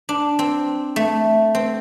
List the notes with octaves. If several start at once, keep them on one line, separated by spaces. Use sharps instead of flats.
D4
C4
A3
C4